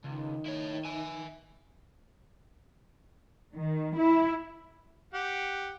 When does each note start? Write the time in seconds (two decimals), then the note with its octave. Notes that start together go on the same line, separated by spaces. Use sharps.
0.05 C#2 D#3
0.46 E4 C#5
0.85 E5 G#5
3.57 D#3
4.00 E4
5.14 G4 F#5